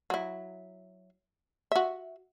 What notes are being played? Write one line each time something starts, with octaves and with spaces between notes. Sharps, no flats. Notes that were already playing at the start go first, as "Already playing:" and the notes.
F#3 E4
F#4 E5